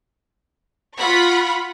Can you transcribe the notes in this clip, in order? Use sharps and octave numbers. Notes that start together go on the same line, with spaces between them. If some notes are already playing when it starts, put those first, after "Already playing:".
F4 F#5 B5 C#6